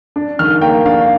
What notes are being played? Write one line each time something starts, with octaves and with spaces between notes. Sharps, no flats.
D4
D#3 F6
A#3 G5
D4 F5